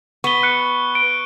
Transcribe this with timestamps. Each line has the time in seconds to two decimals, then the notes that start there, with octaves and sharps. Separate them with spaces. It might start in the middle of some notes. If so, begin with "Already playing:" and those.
0.24 B3 C#6 G7
0.43 F#6 C#7
0.95 D7